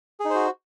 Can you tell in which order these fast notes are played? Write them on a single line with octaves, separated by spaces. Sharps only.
G#4 D#4 C5 F#4